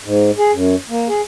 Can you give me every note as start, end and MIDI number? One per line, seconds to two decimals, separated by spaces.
0.04 0.31 44
0.38 0.52 68
0.52 0.75 42
0.90 1.08 58
1.09 1.21 68